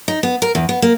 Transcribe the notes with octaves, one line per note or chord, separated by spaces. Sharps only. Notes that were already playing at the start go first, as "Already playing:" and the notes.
D#4
B3
A#4
E2
B3
A#3